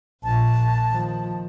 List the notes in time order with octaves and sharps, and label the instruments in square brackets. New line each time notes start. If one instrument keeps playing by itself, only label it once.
[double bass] A#1 A#2 [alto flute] A5
[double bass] D#3 F3